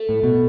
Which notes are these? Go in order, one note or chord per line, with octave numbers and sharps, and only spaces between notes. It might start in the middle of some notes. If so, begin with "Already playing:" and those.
Already playing: A3
A2
B2